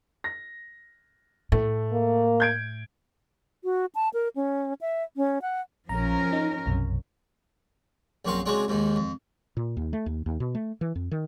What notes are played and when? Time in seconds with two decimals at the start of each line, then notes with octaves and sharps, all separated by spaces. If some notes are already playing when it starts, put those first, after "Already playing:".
0.24 A#6
1.52 A2 A3
1.92 A#3
2.40 G6 G#6 D7
3.64 F#4
3.95 A5
4.14 A#4
4.36 C#4
4.81 E5
5.17 C#4
5.42 F#5
5.89 A#1 F3 C#4 A#4 A#5
6.33 D#4
6.66 B1 F#2 C3
8.25 A#1 F#2 A#2 C4 F#4 F5
8.46 C#3 F#3 G#3 C4 D4
8.68 D#2 G#2 D#3
8.96 F2
9.57 A#2
9.77 D#2
9.93 A3
10.06 D#2
10.26 D#2
10.40 B2
10.55 A3
10.81 E3
10.95 F2
11.11 D#3